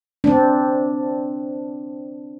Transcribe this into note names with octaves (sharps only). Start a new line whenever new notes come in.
C4 D4